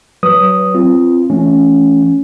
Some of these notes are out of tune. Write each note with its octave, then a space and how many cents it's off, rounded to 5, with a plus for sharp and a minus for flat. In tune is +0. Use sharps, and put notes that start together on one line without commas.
F#3 +25 B4 +0 D#6 +0
C4 +0 F4 -25
E3 +0 A3 -20 C#4 +5